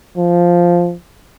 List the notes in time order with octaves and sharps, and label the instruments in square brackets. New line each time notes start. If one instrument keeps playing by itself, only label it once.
[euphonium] F3